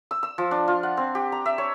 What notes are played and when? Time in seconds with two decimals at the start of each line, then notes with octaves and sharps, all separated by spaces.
0.11 E6
0.23 E6
0.38 F3
0.51 D4
0.68 F4
0.83 F#5
0.97 C4
1.15 G4
1.32 A#5
1.46 E5
1.58 C#5